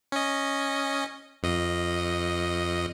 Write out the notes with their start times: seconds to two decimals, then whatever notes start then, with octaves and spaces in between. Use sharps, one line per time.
0.12 C#4 D#5
1.43 F2 D#5